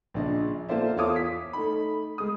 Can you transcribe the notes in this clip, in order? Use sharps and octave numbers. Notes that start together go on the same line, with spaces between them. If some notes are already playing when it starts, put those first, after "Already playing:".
A#1 C#3 D4 D#5
A#3 F4 A4 C5 D5 E5
E2 F4 A4 C#5 D6 D#6
B6
A3 D#4 B5
G#3 D#6